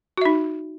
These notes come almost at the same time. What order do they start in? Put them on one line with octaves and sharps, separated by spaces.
F#4 E5 D#4